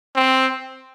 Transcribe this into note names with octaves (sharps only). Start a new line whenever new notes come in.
C4